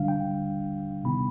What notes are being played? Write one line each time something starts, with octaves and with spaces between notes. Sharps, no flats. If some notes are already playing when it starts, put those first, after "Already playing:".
Already playing: D3 G3 D4 F5
G5
C3 D#3 G3 B3 D#4 B5